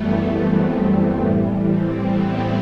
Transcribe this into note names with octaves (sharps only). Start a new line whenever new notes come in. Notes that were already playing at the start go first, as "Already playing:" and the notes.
Already playing: F#2 E3 G3 A3 B3
C4
A3
A2 E3 G3
C4
B3